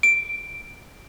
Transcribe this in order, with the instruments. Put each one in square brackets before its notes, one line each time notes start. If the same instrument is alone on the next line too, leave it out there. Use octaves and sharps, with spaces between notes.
[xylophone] D7